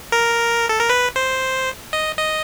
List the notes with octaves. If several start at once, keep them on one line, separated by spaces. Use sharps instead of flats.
A#4
A4
A#4
B4
C5
D#5
D#5